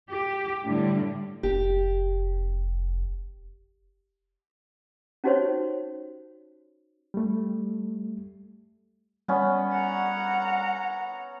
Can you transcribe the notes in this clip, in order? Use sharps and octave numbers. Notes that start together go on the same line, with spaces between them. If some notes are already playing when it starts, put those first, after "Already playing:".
G4
A2 D3 G3
F1 G4
C#4 D#4 F#4 G4 C5 C#5
G3 A3
G3 B3 C#4 D5
F#5 A#5